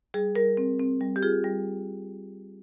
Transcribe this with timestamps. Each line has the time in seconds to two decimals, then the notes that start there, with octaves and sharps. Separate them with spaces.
0.14 G3 G#4
0.35 G3 A#4
0.57 C4
0.79 C4
1.01 G3
1.16 G4
1.23 F4 G#4
1.44 G3